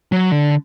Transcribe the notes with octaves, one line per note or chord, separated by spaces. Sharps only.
F#3
D3